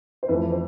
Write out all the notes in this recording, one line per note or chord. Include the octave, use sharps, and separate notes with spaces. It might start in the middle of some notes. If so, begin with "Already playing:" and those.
C5
F2 E3 A3 B4
C5